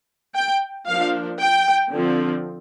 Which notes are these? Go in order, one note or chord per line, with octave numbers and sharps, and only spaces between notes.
G5
F3 A#3 D4 F5
G5
D3 F3 C4